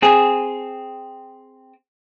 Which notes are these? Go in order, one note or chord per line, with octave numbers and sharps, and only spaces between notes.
C4 G#4